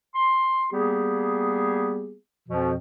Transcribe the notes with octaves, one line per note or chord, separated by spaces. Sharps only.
C6
G3 A#3 B3 G4 G#4
F2 B2 F3